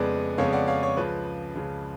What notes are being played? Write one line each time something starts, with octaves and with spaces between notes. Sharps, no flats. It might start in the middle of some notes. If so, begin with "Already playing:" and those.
Already playing: F2 C#3 G#3 B3 B4 D5
F2 C#3 G#3 B3 C#5 F5
D5 F#5
C#5 F5
C#5
C#2 C#3 F3 B4
C#2 C#3 F3